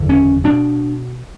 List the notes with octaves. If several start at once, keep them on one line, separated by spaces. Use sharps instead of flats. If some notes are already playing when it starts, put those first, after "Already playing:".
Already playing: F#1 E2 D3
C#4
B2 D4